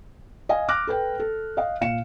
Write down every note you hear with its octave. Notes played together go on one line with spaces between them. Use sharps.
D#5 F5 G#5
D6 F6 F#6 A#6
A4 B4 G5
A4
D#5 F5
A#2 F5 C#7 E7